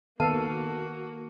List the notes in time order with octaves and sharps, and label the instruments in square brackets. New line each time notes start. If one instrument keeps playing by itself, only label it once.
[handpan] D#3 [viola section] A#3 F#4 [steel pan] B3 A4 F5 [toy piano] A5